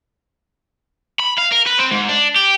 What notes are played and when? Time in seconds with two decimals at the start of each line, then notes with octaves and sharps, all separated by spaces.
1.19 B5
1.38 F5
1.52 A#4
1.66 B4
1.79 C4
1.91 G#2
2.09 D4
2.36 G4